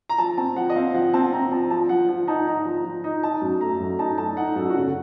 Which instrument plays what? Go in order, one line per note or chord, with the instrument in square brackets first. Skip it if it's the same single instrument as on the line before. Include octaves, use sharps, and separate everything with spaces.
[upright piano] A#5
[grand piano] F3 [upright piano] A5
[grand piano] C4 [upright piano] A5
[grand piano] F3 [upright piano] F#5
[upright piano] D#5
[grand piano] C4 [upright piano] F5
[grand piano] F3 [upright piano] F#5
[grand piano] C4 [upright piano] A5
[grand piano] C4 [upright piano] A#5
[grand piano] F3 [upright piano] A5
[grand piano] F3 [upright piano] A5
[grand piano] F3 [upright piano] F#5
[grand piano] F3 [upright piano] F#5
[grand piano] D#4 [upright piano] A5
[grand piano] D#4 [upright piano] A#5
[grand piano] F3
F3
D#4
[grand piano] D#4 [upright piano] A5
[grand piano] F#2
[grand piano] A3 [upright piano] A#5
[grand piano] F#2
[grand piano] D#4 [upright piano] A5
[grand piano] A3 [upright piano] A5
[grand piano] D#4 [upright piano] F#5
[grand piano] F#2 [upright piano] A4
[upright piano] F#4
[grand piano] C#3 [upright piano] A4